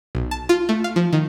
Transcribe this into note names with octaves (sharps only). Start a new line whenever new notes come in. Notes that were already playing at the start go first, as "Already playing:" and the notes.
B1
A5
F4
A3
F5
F3
D#3